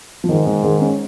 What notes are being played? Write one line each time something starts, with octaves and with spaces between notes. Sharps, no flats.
F3
G#2 D#3
D#3 G#3
D#3 G#3
G#3 C#4